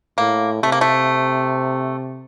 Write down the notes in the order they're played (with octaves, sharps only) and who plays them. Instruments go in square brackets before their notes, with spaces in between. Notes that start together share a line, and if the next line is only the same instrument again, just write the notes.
[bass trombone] A2 [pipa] A#3
[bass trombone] C3 [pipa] A3
[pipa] A#3
A3